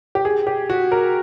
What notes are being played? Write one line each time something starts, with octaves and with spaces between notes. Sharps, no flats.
G4
G#4
G4
F#4
A#4